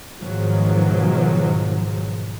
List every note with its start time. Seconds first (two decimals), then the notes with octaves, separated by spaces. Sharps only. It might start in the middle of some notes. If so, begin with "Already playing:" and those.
0.19 G#2 B2 D#3 F3 F#3 G#3